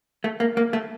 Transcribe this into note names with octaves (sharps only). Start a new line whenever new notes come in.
A3
A#3
A#3
A3